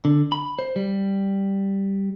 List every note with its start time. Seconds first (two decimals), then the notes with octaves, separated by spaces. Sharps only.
0.05 D3
0.32 B5
0.59 C5
0.76 G3